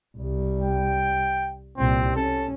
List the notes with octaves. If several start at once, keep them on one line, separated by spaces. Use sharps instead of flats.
C2 G3
G5
C2 A#2 C4
C#4 A4